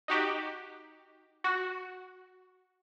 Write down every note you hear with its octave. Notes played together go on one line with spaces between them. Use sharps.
D#4 F#4 G4
F#4